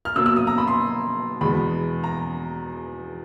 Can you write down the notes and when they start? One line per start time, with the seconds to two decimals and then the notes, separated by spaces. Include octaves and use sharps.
0.05 F6
0.16 B2 F#3 A#3 E6
0.26 E6
0.36 D#6
0.47 A#5
0.58 B5
0.68 C6
1.41 E2 B2 G#3 B5
2.04 A#5